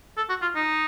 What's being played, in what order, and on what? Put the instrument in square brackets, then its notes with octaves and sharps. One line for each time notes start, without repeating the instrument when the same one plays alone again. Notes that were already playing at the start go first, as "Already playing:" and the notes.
[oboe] A4
F#4
F4
D#4